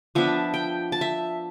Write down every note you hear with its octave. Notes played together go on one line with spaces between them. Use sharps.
F3 B3 D4 E5
G5
A5
E5